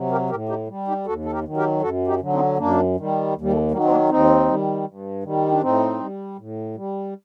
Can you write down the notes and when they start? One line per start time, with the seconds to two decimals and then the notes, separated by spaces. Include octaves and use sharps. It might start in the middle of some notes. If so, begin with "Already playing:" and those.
Already playing: C3 F#3
0.11 G4 A#4
0.30 A2 G4 A#4
0.49 D#4 G4
0.68 G3
0.88 D#4 G4
1.06 D#2 F#4 A4
1.25 A4
1.32 G4 A#4
1.44 D#3 F#3
1.57 G4 A#4
1.81 F#2 F#4 A4
2.07 D#4 G4
2.20 D3 F#3
2.33 C4 D#4
2.58 F#2 A#3 D4
2.96 D#3 G3
3.34 D#2
3.41 G3
3.52 A3
3.71 D#3 F#3 G3 A#3
3.84 C4
3.90 A#3 D4
4.09 D#2 C4 D#4
4.48 D#3 G3
4.86 G2
5.23 D#3 G3
5.51 D4
5.61 A2 C4 D#4
5.99 G3
6.38 A2
6.76 G3